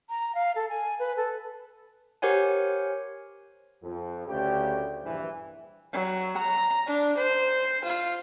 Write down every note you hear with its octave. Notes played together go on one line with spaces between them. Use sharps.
A#5
F5
A4
G#5
B4
A4
G4 A#4 C5 C#5 F#5 G#5
F2
D2 C#3 G4 G5
A#1 G2 C3 E3
F#3
A#5
D4
C5
F4